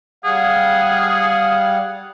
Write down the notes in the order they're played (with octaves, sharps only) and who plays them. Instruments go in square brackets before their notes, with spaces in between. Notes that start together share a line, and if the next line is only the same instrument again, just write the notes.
[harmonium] G3 F5 F#5 [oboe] G#4